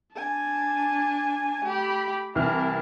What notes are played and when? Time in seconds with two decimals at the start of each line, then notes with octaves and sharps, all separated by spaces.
0.16 D4 G#5 A5
1.64 A3 G4 B5
2.35 C2 E3 E4 A#4 A5 F6